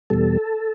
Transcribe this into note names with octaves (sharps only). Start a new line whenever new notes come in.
E2 B2 G3 A4